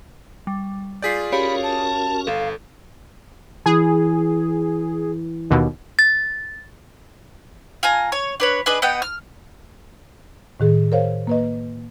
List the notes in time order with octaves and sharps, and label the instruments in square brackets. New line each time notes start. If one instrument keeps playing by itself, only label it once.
[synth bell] G3
[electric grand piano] F4 G#4 D5 [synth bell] G6 B6 C7
[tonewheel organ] C#4 F#4 A#4 [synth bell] G4 C#5 F5 [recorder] B5
[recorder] A5
[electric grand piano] G1 [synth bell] A4 [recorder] F5
[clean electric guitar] E3 [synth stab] G#4
[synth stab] D#2 B2
[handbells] A6
[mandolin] F4 G#5 A#5
C#5
D4 B4 C#5
D4 G#4 B4 D#5
B3 D#5 F#5 G5
F6
[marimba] A2 D#3 G#4
A#4 C5 C#5 F5
A#3 B4 D#5